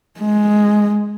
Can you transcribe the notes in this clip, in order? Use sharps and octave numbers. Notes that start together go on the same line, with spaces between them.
G#3